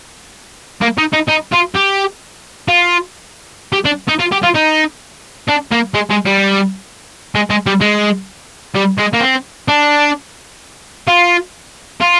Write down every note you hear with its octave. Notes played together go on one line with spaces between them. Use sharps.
A#3
D#4
D#4
D#4
F4
G4
F4
G4
D4
D#4
F4
G4
F4
D#4
D4
A#3
G#3
G#3
G3
G#3
G#3
G3
G#3
G3
G#3
A#3
C4
D4
F4
F4